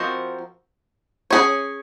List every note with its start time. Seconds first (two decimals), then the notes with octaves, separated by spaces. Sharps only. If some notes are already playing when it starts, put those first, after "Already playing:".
Already playing: F3 C4 F#4 A#4 D#5
1.30 C#4 G#4 C#5